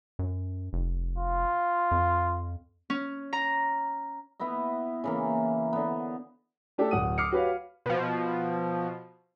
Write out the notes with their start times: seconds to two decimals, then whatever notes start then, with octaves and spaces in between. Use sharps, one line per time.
0.19 F#2
0.73 F1
1.18 F4
1.91 F2
2.90 C#4
3.33 A#5
4.40 B3 E4 B4 D#5
5.04 C#3 E3 A#3
5.73 D3 B3
6.78 A3 D4 G4 A4
6.91 D1 F#5 D#6 D#7
7.18 D6 D#6 F6 C7 C#7
7.31 F#4 G4 B4 C#5 F5
7.86 B2 F3